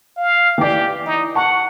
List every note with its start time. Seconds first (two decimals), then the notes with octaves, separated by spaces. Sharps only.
0.17 F5
0.58 E3 G4 D5
1.06 D#4
1.35 F#5 A5 C#6